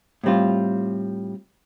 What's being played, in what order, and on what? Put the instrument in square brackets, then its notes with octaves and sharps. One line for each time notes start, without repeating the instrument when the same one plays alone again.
[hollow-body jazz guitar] A2 G3 C4 F4